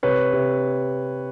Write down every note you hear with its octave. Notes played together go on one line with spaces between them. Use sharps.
C3 B4 C#5
C3